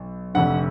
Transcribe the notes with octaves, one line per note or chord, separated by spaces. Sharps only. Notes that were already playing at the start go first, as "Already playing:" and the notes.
Already playing: B1
F1 F2 D3 F#5